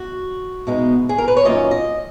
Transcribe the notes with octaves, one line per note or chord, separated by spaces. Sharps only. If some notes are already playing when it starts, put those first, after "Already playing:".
Already playing: F#4
B2 G#3 B3 D#4
G#4
A#4
B4
C#5
F#2 D#3 A#3 C#4 F4 D#5
D#5